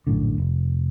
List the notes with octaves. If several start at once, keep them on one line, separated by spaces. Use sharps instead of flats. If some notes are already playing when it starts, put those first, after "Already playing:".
A#1 F#2 A2 D3
F1